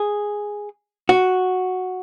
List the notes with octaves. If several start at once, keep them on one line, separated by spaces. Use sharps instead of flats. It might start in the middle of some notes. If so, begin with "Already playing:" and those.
Already playing: G#4
F#4